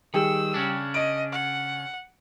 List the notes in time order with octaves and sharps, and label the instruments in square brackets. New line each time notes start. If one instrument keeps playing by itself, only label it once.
[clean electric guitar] D#3 [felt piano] G3 G#4 G5 [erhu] E6
[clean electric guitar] C#3 C#4 D4
[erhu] D#5 [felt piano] D7
[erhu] F#5